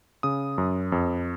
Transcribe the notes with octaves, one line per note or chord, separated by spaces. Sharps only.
C#3 D#6
F#2
F2